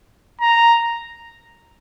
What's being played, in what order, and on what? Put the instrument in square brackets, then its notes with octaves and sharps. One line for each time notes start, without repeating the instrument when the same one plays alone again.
[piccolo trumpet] A#5